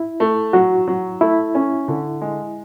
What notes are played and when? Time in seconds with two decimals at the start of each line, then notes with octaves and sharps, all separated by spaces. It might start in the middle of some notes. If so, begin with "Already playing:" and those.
Already playing: E4
0.20 A3
0.53 F#3 F#4
0.87 F#3
1.21 A3 E4
1.55 C#4
1.88 D3
2.21 G#3